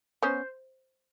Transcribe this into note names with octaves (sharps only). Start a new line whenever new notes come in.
B3 C#4 C5